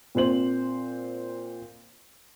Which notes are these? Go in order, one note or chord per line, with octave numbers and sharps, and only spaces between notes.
A#2 C4 C5 F#7